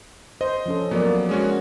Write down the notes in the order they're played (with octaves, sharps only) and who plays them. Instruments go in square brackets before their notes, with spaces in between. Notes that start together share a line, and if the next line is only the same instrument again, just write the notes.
[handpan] C5 [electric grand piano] D#5
[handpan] F3 C#4 A4
[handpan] F3 A#3 D5 [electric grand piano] F#3 B3
[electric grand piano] G#3 C#4 F#4